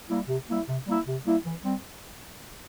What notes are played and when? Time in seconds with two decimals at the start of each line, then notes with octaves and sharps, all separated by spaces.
0.09 G3 A#3 E4
0.28 C3
0.48 G3 A#3 E4
0.68 C3
0.86 G3 A#3 E4
1.07 C3
1.25 G3 A#3 E4
1.45 E3
1.64 G3 C4